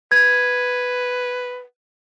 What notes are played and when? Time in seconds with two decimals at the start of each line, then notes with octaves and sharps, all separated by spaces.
0.12 B4 G#6